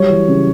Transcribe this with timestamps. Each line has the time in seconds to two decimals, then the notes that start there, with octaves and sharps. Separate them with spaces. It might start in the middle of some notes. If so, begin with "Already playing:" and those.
Already playing: F#3 G3 C#5
0.09 E3
0.28 C#3